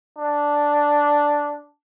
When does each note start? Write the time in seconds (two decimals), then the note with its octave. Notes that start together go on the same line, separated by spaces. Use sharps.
0.18 D4